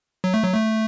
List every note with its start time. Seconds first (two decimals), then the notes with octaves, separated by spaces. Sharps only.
0.24 F#3
0.34 A3
0.43 F#3
0.54 A3